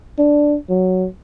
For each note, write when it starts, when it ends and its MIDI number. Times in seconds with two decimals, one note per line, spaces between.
0.19 0.57 62
0.70 1.06 54